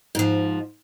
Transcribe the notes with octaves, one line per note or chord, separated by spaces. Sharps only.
G#2 F3